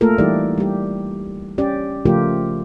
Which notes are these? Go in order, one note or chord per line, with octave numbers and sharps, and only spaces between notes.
A3 A#3 F4 A4 A#4
E3 G3 D#4 E4 G4 D5
G3 G4
C#4 G4 D5
C#3 F3 A3 F4 G4 A#4